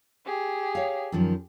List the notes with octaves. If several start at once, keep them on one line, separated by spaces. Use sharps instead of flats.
G4 G#4
C#5 F5
F#2 D#3 F3